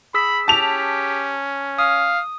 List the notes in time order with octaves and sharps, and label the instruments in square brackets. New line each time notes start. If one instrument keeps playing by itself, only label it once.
[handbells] G#4 E6 B6 [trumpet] B5
[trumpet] C#4 [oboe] G4 [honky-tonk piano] A5 F7
[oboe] F5 [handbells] D#6